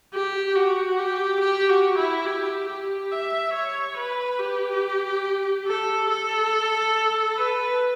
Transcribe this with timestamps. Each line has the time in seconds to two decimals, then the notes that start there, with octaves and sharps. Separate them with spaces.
0.14 G4
0.56 F#4
0.99 G4
1.41 G4
1.69 F#4
1.98 E4
2.26 G4
2.68 G4
3.12 E5
3.53 C#5
3.97 B4
4.39 G4
5.67 A4
6.09 A4
7.36 B4